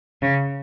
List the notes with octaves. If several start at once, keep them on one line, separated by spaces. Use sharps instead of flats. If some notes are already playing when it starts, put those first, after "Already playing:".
C#3